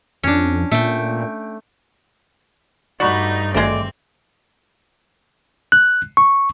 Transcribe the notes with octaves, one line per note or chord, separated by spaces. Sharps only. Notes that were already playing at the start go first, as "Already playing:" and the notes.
F2 C#4 D4
A#2 A3 G5
G2 A3 D#4 F#4 D5 B5
G#1 D3 G#3 A3 C4 D5
F#6
C#6